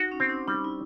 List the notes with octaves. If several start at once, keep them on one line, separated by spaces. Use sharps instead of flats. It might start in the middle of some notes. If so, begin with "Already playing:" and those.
Already playing: D#4 F#4
C#4
C4
D4
G3 D#4
E4